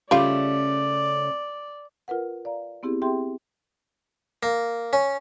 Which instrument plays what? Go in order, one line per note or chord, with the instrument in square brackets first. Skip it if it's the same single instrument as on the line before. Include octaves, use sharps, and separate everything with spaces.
[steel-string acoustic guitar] C#3 A3 C#4 [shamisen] G3 F4 [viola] D5
[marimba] F4 A#4 B4 F#5
D5 F5 A#5
B3 C4 E4 G4 G#4
C4 G4 G#4 E5 G5 C6
[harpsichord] A#3
C#4